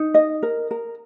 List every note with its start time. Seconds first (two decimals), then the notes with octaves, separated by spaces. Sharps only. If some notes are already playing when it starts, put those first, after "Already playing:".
Already playing: D#4
0.14 D#5
0.43 A#4
0.71 A#4